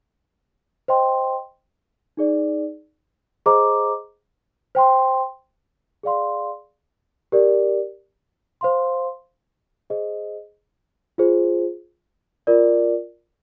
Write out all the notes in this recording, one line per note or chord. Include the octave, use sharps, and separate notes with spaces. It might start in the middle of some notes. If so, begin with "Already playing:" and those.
C5 D#5 G5 C6
D#4 G#4 D5
G#4 C5 D#5 A#5 D6
C5 G5 C6
G#4 D5 F5 C6
G4 A#4 D5
C5 F5 C6
G#4 C5 D#5
F4 G#4 C5
F4 A#4 D5